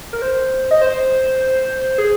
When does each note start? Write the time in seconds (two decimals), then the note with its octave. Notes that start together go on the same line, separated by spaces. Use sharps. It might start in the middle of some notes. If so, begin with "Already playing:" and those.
0.13 A#4
0.22 C5
0.71 D#5
0.81 C5
1.98 G#4